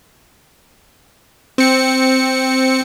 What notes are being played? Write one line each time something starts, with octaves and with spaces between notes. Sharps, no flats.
C4 C#7